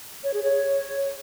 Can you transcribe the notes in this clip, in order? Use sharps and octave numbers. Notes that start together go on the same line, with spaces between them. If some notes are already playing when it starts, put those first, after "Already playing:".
C#5
G#4
C#5